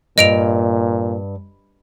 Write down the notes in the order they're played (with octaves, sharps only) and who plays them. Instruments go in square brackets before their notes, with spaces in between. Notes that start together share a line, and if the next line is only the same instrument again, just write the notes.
[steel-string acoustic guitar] G2 [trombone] A#2 [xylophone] D#5 D7 F7